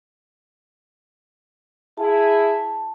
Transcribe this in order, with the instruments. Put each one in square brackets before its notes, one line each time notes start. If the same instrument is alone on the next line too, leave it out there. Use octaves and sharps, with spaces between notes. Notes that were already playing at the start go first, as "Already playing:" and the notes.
[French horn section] E4 G#4 [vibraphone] A5